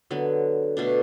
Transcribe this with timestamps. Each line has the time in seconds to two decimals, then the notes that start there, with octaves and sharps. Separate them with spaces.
0.11 D3 F#3 B3
0.77 B2 A3 D4